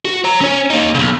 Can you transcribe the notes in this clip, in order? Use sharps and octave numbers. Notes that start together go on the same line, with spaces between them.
F#4
C#5 A#5
C#4 C#5
A#3 D#4
B1 C#3